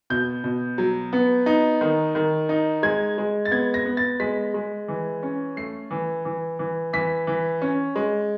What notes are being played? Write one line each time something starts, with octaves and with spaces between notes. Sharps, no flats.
B2 G6
B2
F#3
B3
D#4
D#3
D#3
D#4
G#3 G#6
G#3
A6
B3 G#6
A#6
B3
A6
G#3 B6
G#3
E3
C#4
A3 C7
E3
E3
E3
E3 B6
E3
C#4
G#3